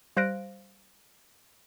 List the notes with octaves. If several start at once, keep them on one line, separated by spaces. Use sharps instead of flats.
G3 C5 F5 F#6 A#6 D7